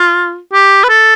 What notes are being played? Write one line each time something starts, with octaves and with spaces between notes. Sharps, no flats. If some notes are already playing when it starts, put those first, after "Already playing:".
Already playing: F4
G4
B4
A4